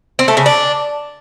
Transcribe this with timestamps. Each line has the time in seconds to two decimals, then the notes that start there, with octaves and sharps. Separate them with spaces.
0.19 C4
0.28 A3
0.37 C#3
0.46 D4